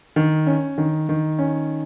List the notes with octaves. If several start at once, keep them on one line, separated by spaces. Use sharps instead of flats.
D#3
C#4
D#3
D#3
C#4